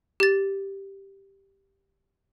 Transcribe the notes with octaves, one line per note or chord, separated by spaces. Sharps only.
G4 A6